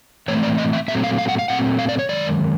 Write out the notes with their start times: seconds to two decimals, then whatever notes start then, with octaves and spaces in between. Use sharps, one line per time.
0.28 A2 E3 A3 C4 C#5
0.43 D5
0.58 D#5
0.73 E5
0.88 A#2 F#3 A3 C4 E5
1.04 F5
1.19 F5
1.28 F#5
1.39 F5
1.48 A#2 F#3 A3 C4 F#5
1.79 F5
1.89 D5
1.99 C#5
2.09 F#2 D#3 G#3 D5